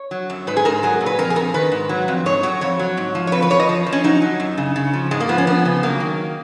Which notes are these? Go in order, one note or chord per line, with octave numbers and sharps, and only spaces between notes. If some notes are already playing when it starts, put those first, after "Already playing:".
Already playing: C#5
F#3
F#2
G#2 B4
G#4
G#2 A#4
F#3 G#4
A#2
B4
F2 A#4
G#4
F2 A#4
D#3 B4
G#2
F#3
F2
G#2 C#5
F#3 C#5
F2 C#5
F#3
G#2
F3
C#5
F2 B4
B4
F2 C#5
D#5
F3
F3
C#4
F#3 D#4
F#3
F#2
C#3
C#3
F3
G#2 G#3
A#3
F3 B3
C#4
F2 B3
C#3
F#3 A#3
D#3